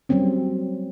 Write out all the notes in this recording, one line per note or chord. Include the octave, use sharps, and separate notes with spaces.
F#3 G3 A#3 C4 C#4